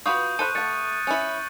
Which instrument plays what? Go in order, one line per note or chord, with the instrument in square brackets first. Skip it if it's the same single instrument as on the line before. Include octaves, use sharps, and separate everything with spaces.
[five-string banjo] F4 F#4 B4 [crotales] C#6 D#6 G6
[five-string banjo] A4 C5 B5 [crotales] F#6 D#7
[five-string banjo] A3 F#5 [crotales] F#6 A6 C#7
[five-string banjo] C#4 E4